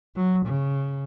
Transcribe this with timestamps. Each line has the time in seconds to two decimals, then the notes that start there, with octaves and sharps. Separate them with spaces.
0.15 F#3
0.45 C#3